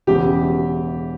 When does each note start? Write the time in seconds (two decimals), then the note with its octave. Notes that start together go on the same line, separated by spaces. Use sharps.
0.07 E1 E2 C#3 G4